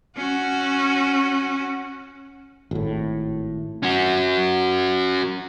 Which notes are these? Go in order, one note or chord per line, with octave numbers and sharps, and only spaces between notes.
C#4 F#4
G#1 A2
C#4 F#4